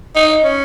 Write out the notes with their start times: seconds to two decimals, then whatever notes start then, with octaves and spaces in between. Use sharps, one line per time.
0.15 D#4
0.44 C#4